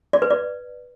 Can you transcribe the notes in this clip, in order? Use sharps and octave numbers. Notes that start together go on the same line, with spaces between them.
D5
B4
D5